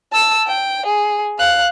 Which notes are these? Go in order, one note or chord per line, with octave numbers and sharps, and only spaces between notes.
A5 E6
G5
G#4
F5 F#6